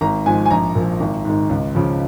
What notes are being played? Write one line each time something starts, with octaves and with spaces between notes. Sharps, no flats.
G#1 A#5
G#2 F3 G#5
G#5
A#1 A#5
A#2 F3
G#1
G#2 D#3
C#2
C#3 F3